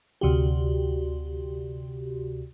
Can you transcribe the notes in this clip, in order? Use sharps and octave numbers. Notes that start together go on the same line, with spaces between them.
D2 C3 F#4 G4